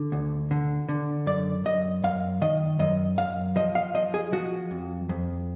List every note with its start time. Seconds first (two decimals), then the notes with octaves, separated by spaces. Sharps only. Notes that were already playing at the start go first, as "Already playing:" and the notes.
Already playing: D3
0.12 D2
0.51 D3
0.89 D3
1.26 F#2 D5
1.65 F#2 D#5
2.04 F#2 F5
2.42 D#3 D#5
2.79 F#2 D#5
3.18 F#2 F5
3.56 F3 D#5
3.75 F5
3.94 F3 D#5
4.14 G#4
4.32 F3 F#4
4.71 F2
5.09 F2